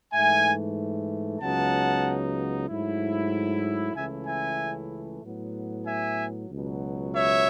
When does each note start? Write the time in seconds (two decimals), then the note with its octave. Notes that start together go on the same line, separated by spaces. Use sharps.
0.13 G#2 E3 A3 E5 G#5
1.40 C#2 C#3 F#3 B3 D#4 F#5 A5
2.68 G#2 F#3 A3 E4
3.95 C#2 C#3 E3 A3 E4 E5 G#5
4.27 E5 G#5
5.23 A2 F#3 B3
5.87 E5 G#5
6.50 C#2 B2 F#3
7.14 C#5 E5